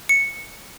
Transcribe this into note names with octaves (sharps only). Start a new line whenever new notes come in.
C#7